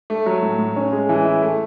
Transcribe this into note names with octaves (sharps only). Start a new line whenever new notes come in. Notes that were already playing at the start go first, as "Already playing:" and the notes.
A3
F#3
A2
A2
C#4
G#3
E3
E4
A3